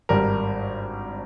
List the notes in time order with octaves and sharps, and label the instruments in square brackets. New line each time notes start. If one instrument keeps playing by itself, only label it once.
[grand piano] G#1 G2 G3 A#4